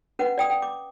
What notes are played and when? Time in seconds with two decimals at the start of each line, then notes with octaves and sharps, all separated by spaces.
0.19 C#4 B4 F#5
0.38 D5 G5 D#6
0.50 G5
0.62 D6